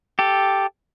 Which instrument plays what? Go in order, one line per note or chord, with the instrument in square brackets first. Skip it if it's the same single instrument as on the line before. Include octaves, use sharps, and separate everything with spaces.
[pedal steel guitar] G4 A4